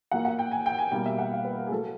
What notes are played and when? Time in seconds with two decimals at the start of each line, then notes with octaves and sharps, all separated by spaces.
0.11 A#2 F#3 A#3 F#5
0.25 F#5
0.39 G5
0.51 G#5
0.66 G5
0.78 G#5
0.91 B2 G3 A#3 G5
1.06 E5
1.18 F#5
1.32 F5
1.44 B4
1.58 A#4
1.67 G#4
1.71 A2 F#3 A3 A4